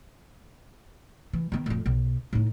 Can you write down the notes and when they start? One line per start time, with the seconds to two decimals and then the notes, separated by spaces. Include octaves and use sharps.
1.33 E3
1.52 D#3 B3
1.66 D1 F2
1.86 B1
2.33 A2 D#4